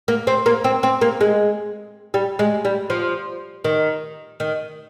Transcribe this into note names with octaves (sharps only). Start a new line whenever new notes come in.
A#3
C4
A#3
C4
C4
A#3
G#3
G3
G#3
G3
F3
D#3
D#3